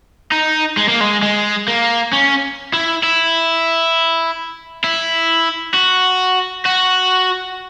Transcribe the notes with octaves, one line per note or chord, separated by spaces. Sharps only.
D#4
G#3
A#3
G#3
G#3
A#3
C#4
E4
E4
E4
F#4
F#4